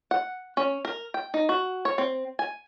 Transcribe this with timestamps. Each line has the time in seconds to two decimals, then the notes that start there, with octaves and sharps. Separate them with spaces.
0.11 F#5
0.57 C#4
0.85 A#4
1.14 G5
1.34 D#4
1.49 F#4
1.85 C#5
1.98 C4
2.39 G#5